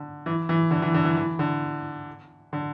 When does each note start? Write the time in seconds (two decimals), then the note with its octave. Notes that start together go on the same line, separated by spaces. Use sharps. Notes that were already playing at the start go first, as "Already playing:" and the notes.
Already playing: D3
0.26 E3
0.49 E3
0.71 D3
0.82 E3
0.94 D3
1.05 E3
1.17 E3
1.39 D3
2.53 D3